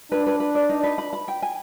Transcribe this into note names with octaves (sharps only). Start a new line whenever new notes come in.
D4 B4
B4
B4
D5
D#4
B4
B5
B5
G5
G#5